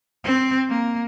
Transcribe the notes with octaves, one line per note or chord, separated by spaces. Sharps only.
C4
A#3